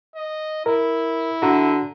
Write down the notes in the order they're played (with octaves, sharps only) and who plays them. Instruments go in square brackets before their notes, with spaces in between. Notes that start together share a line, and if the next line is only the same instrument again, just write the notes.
[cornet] D#5
[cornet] E4 [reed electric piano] A#4
[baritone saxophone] D3 [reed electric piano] F#4 A#5